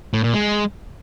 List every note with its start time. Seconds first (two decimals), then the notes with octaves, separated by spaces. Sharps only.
0.14 A2
0.24 A#2
0.34 G#3